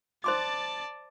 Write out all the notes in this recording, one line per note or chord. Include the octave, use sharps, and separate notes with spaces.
C5 D5 A5 C6 D6